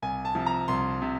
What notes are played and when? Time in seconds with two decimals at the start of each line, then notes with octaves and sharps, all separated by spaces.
0.02 C2 G#5
0.25 A5
0.35 C3 F3
0.46 A#5
0.68 C2 C6
1.02 C3